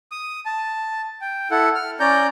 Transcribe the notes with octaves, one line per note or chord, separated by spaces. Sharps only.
D#6
A5
G5
E4 A4 F#5
F6
C#4 D5 A#5 G6